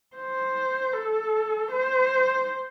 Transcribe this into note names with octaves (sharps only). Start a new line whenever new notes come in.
C5
A4
C5